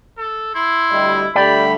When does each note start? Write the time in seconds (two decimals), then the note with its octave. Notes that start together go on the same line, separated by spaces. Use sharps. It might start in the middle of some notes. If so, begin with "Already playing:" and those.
0.18 A4
0.55 E4 C6
0.91 D2 G3 D#5
1.36 D3 G3 A3 D5 G5 B5